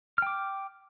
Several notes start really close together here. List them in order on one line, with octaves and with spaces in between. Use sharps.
F6 G5 D6